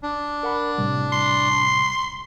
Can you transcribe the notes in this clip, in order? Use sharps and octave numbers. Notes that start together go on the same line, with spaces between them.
D4
A#4 F#5 B5
A2 C3 G3
C6